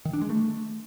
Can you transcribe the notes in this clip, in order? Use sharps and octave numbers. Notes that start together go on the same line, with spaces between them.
D#3
D4
G#3
A3